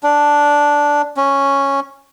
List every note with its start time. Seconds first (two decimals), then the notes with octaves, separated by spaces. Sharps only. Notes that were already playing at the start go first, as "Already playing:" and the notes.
0.03 D4
1.17 C#4